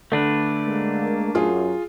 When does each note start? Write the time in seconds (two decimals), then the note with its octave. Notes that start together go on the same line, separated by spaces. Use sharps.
0.12 D3 A3 D4 B4
0.66 G#3 A#3
1.35 F#2 F4 G#4